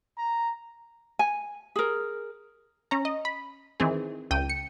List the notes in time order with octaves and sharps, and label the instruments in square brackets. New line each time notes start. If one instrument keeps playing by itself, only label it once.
[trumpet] A#5
[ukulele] G#5
G#4 A#4
[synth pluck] C#4 A#5
D#5
B5
D#3 E3 C4 G#4
C#2 G5 D#7
C#7